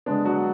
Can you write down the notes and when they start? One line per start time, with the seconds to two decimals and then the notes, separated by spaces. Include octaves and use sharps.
0.06 D3 G#3 B3 D4
0.25 F#3 F#4